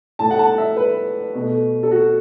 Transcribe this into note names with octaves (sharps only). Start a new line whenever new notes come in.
A2 A3 A5
F#5
A5
E5
B4
B2 A3
A4
F#4